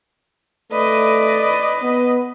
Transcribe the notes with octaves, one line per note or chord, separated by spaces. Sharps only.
A3 B4 D5 D#5
B3